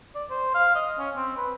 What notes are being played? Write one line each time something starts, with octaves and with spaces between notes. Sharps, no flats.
D5
C5
F5
D#5
C#4
C4
B4